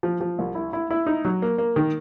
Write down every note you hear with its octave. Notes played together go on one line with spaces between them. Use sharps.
F3
F3
C2
E4
E4
E4
D#4
F#3
A#3
A#3
D#3